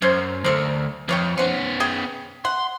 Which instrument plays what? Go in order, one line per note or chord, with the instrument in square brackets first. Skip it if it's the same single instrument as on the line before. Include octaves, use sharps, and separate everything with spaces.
[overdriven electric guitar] F#2 [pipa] C#4 C5
[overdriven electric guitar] D2 [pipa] A4 A#4 C5
[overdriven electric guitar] F2 [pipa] B4 C#5 G5
[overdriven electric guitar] B3 C#4 [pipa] C5 F#5
[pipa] G#4 G5
[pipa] F#5 [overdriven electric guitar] C6